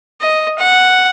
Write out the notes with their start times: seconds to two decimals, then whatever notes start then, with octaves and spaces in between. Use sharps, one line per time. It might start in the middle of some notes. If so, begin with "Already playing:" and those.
0.22 D#5
0.59 F#5